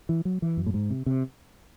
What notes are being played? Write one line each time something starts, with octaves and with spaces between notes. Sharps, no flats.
E3
F#3
E3
F#2
A2
G#2
C3
C3